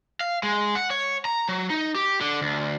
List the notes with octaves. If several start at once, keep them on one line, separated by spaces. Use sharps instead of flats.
F5
G#3
F#5
C#5
A#5
F#3
D#4
G4
D3
D2